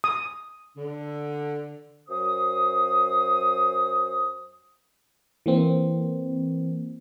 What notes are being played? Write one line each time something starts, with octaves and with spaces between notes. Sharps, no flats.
D#6
D3
F#2 C5 D#6
E3 A#3 C4